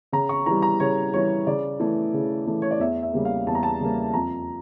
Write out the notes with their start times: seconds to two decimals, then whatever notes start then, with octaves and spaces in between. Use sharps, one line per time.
0.13 C#3 A#5
0.29 C#6
0.46 E3 G3 A#5
0.62 A#5
0.80 C#3 C#5
1.13 E3 G3 C#5
1.47 C#3 D5
1.80 E3 A3
2.14 C#3
2.47 E3 A3
2.62 C#5
2.71 D5
2.80 E2 E5
3.03 E5
3.13 C#3 G3 A#3
3.25 F5
3.47 E2 A5
3.55 A#5
3.63 A5
3.80 C#3 G3 A#3
4.14 F2 A#5